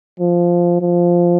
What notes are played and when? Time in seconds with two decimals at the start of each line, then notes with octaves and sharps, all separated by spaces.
0.20 F3
0.81 F3